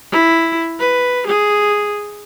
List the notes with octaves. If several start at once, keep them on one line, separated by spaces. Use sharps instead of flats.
E4
B4
G#4